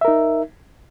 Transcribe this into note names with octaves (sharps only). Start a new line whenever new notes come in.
D#4 A#4 E5